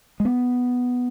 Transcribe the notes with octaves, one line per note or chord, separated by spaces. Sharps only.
G#3
B3